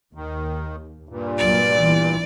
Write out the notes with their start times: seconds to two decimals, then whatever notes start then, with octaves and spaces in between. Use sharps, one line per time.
0.15 D#2 D#3
1.09 G2 A#2
1.38 C2 F#3 A#3 D5
1.75 E3 B3